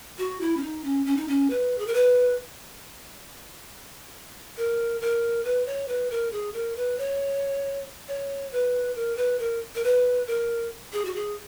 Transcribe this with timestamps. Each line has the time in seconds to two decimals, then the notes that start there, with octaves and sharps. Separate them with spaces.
0.18 F#4
0.41 E4
0.57 C#4
0.62 D#4
0.84 C#4
1.06 C#4
1.17 D#4
1.28 C#4
1.50 B4
1.78 G#4
1.87 A#4
1.94 B4
4.57 A#4
5.01 A#4
5.45 B4
5.66 C#5
5.88 B4
6.11 A#4
6.32 G#4
6.54 A#4
6.76 B4
6.98 C#5
8.08 C#5
8.52 B4
8.95 A#4
9.17 B4
9.39 A#4
9.75 A#4
9.84 B4
10.27 A#4
10.93 G#4
11.05 F#4
11.15 G#4